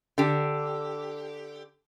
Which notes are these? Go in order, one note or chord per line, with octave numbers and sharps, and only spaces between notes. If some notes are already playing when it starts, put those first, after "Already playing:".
D3 G4